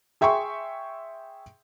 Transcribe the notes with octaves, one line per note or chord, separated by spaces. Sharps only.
G#4 E5 G5 C6 C#6